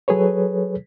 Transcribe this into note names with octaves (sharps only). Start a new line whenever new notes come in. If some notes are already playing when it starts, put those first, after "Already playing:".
F#3 G#4 A4 B4 C#5